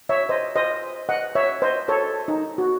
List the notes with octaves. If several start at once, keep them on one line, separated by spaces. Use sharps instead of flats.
C#5 E5
C5 D#5
C5 D#5
D#5 F#5
C#5 E5
C5 D#5
A4 C#5
D#4
F#4